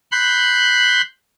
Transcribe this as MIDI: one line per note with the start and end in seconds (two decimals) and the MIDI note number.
0.12 1.02 83
0.12 1.02 84
0.12 1.02 90
0.12 1.02 91